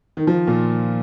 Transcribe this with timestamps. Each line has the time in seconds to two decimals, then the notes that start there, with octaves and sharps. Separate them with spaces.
0.17 D#3
0.27 F3
0.47 A#2